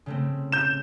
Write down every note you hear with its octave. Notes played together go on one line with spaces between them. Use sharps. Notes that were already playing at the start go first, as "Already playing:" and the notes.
C#3 A3 C4
G6 E7